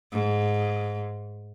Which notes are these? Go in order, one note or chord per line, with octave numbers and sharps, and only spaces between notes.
G#2